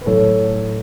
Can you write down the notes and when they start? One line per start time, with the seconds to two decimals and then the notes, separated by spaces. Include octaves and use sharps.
0.01 B4
0.06 A2 F#3 A3 A4 C#5